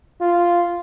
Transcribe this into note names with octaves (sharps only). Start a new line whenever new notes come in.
F4